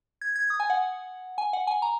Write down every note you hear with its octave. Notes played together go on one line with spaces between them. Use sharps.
G#6
G#6
D#6
G#5
F#5
G#5
F#5
G#5
A#5